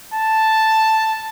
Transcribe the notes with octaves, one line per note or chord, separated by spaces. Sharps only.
A5